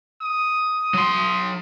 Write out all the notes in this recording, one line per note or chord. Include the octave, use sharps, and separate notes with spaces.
D#6
F#3 C6